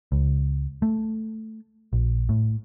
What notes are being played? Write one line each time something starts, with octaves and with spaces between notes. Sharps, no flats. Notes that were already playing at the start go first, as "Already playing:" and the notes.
C#2
A3
A#1
A2